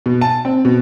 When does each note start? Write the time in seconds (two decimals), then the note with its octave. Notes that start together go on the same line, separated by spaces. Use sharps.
0.06 B2
0.21 A5
0.45 C4
0.65 B2